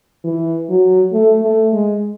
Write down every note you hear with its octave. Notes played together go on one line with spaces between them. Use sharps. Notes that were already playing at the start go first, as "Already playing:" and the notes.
E3
F#3
A3
A3
G#3